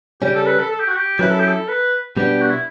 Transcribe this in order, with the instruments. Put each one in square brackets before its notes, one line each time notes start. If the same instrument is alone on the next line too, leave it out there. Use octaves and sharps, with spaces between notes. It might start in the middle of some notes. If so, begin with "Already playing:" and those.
[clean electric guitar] C#3 G3 C#4 [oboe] G4
[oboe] A4
B4
A4
A4
G4
F#4
G4
[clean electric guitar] F#3 C#4 E4 [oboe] B4
[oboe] A4
G4
A4
B4
[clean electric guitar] B2 G3 B3 D4 [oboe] G4
[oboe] F#4
E4